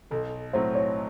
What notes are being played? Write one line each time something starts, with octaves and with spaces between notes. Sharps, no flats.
B1 A4
A2 F#3 A3 C4 C5
C#5